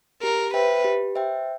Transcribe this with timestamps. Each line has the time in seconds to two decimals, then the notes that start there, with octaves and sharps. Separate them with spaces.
0.23 G4 A#4
0.54 B4 C5 E5 G5
0.84 G4
1.15 C5 E5 G5